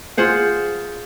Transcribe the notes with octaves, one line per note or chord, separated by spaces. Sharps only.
F4 G#4 C5 F#5